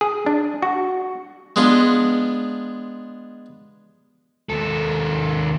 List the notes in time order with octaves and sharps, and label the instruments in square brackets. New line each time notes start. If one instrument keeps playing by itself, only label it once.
[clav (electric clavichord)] G#4
D4
F#4
[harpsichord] G#3 B3 D4 F4
[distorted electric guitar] D#2 A4